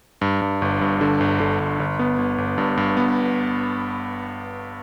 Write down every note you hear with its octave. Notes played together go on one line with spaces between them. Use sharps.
G2
G2
G1
G2
D3
G1
D3
G1
G1
B3
G1
G1
G2
G2
B3